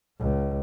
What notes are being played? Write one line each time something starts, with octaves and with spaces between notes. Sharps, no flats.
C#2